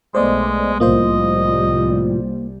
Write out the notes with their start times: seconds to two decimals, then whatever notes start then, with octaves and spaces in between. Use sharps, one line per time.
0.15 B1 G#3 A3 B3 C5 D5 D#5
0.80 C2 A2 F3 G3 A#3 F4 C5 D#5